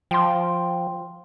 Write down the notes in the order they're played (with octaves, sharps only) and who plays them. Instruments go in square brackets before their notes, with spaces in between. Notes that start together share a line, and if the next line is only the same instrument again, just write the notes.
[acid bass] F3 [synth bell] G5 C6